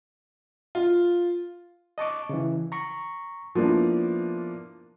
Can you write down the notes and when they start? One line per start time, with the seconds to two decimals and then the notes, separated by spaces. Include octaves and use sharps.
0.75 F4
1.98 D#5 A5 C#6 D6
2.29 C#3 E3
2.72 A#5 C#6
3.55 F3 A#3 B3 D4 E4